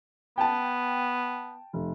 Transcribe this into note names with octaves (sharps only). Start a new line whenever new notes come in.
B3 G5 A5
F1